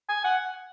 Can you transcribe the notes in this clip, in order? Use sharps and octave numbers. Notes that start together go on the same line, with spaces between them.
G#5
F#5